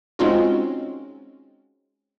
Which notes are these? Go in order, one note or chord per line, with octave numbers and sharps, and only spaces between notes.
G#3 C4 C#4 D#4 F4 F#4